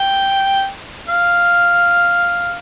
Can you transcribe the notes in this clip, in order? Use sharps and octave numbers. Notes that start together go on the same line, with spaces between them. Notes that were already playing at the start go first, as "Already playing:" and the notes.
Already playing: G5
F5